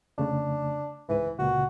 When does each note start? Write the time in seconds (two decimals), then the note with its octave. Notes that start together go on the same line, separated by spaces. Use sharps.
0.18 F2 C#3 A3 D4
1.08 C#2 G#2 E3 B4
1.39 C#2 A#2 C#3 F#4